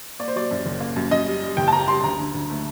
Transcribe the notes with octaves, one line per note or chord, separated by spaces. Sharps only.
A#3 D5
C5
F#3 D5
F#2
F#1
A#3
F#2
F#2 D#5
G3
G3
F#1 G5
A5
G3 A#5
G3 C6
D2 A#5
D3
D2
A3